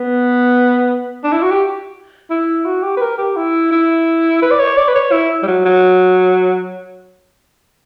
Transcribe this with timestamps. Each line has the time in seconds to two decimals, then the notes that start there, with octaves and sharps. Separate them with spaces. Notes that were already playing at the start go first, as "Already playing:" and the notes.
Already playing: B3
1.24 D4
1.32 E4
1.42 F#4
1.51 G4
2.30 E4
2.65 F#4
2.83 G4
2.97 B4
3.01 A#4
3.18 G4
3.36 E4
3.72 E4
4.42 B4
4.51 D5
4.59 C#5
4.77 D5
4.88 B4
4.95 C#5
5.12 E4
5.43 G3
5.47 F#3
5.65 F#3